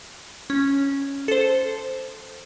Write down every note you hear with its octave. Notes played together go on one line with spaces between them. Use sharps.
C#4
A4 C5